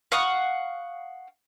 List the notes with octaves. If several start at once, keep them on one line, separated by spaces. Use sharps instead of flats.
F5 F#5 C#6 D#6